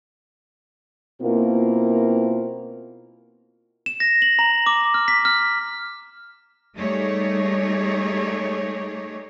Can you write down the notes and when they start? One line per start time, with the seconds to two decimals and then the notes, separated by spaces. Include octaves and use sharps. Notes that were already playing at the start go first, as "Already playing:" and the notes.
1.22 B2 A#3 C4 E4 F4 A#4
3.86 E7
4.00 A#6
4.22 F#7
4.39 A#5
4.66 D6
4.94 F6
5.08 B6
5.25 F6
6.76 G3 A3 D#4 G4 G#4 C#5